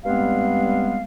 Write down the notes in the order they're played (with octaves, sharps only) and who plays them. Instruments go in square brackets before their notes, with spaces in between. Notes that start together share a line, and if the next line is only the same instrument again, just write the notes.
[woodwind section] G2 G3 G#3 B3 C4 F5